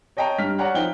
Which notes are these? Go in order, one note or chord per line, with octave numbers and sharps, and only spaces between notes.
C#5 D#5 G5 A5 A#5
G2 F6 B6
C#5 D5 F#5 A#5 F#6
F3 D#4 C5 G5 G7